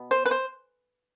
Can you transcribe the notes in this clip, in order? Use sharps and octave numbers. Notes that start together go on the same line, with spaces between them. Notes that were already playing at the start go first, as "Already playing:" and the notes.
Already playing: B2 B3
C5
B4
C5